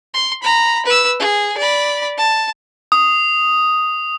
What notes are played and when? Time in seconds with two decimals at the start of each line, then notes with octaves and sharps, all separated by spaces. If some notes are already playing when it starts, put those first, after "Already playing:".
0.14 C6
0.43 A#5 B5
0.86 B4 E6
1.20 G#4
1.58 D5 B5
2.18 A5
2.92 D#6